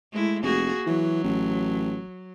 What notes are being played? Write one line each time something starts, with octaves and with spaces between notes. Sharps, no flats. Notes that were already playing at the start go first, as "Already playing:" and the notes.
G#3 A3 E4
F1 A#3 F#4 G#4
E3 F#3
A1